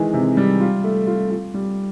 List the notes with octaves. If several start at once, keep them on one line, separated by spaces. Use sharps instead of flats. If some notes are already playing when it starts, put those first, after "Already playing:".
Already playing: D#3 E3 G#3
C3
G3
F4
A3
F4
F4
G3